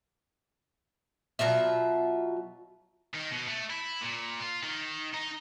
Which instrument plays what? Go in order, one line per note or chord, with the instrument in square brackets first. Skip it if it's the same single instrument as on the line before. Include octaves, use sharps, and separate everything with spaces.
[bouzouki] B2 F#3 F4 E5
[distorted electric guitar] D#3
B2
A3
E4
A#2
F4
D#3
D#4